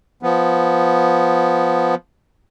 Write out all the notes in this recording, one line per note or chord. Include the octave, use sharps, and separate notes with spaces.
F3 B3